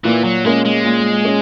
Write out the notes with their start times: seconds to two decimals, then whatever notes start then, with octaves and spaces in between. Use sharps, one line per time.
0.04 A#2 E3
0.24 F#3
0.45 G#3 A#3 C#4
0.65 G#3
0.85 A#2
1.25 C#4